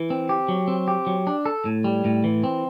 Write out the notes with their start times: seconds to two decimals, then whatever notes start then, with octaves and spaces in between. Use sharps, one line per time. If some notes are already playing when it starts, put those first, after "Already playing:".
Already playing: E3
0.10 C4
0.29 G4
0.48 F#3
0.68 C4
0.88 G4
1.07 F#3
1.27 D4
1.46 A4
1.65 A2
1.84 G3
2.05 A2
2.24 E3
2.44 C4